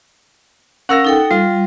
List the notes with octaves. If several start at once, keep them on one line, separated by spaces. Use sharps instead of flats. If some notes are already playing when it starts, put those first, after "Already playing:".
C#4 A#4 F5 F#5 E6 A#6
D#4 A4 G5
G3 F4